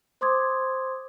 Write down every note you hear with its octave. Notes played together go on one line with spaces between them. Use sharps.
C5 C6 D6 D#6 G#6